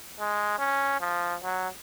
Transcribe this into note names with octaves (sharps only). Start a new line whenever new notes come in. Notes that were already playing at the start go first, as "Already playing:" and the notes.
G#3
C#4
F3
F#3